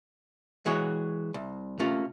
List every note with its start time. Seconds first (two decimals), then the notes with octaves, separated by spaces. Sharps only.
0.66 E3 G#3 F#4 C#5
1.34 C2
1.79 C3 A3 A#3 C#4 F4